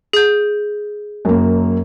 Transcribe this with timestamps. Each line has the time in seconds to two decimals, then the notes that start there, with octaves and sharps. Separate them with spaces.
0.13 G#4 G6
1.25 F#2 A#3